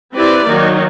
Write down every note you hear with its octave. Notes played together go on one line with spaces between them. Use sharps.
C4 E4 G4 B4 D5
D#3 F#3 A#3 D#4